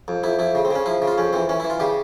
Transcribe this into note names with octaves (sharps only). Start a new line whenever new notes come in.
F2
F2 E4
F2 E4
C#3
C4
C#3 C#4
F3 E4
C#3
F4
F2 C#4
E3 C4
E3 C#4
E4
E3
F4
C#3 G4